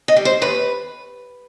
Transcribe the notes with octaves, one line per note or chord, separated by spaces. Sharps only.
D#5
G3
C5
D#2 B4